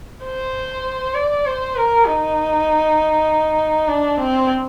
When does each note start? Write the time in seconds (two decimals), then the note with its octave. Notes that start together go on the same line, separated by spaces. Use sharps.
0.25 C5
1.15 D5
1.46 C5
1.76 A#4
2.07 D#4
3.88 D4
4.18 C4